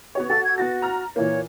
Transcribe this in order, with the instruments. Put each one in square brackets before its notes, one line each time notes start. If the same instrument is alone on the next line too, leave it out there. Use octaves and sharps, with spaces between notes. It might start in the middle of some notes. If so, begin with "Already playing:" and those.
[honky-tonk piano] B3 F#4 C#5
[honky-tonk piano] F#4 A4 F#5 [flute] A6
[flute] G#6
[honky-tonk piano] B3 A6 A#6 [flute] F#4
[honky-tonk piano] A#5 F6
[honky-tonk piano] A#2 E3 A#3 [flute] C#5